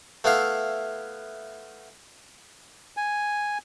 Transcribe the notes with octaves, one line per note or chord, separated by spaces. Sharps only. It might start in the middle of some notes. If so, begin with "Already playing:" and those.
A3 B3 E4 F5
G#5